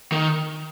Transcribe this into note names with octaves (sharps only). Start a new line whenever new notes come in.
D#3